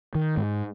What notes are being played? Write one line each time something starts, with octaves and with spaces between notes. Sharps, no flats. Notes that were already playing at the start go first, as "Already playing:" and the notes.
D#3
G#2